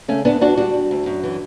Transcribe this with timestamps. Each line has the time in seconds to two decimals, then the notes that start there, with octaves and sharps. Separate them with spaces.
0.08 C#3 A3 C#4
0.25 D2 B3 D4
0.41 D2 D4 F#4
0.57 G3 D4 F#4
0.74 G3
0.91 D2
1.06 F#2
1.23 E3